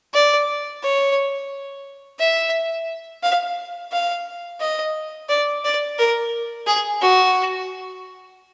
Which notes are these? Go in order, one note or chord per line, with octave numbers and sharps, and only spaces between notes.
D5
C#5
E5
F5
F5
D#5
D5
D5
A#4
G#4
F#4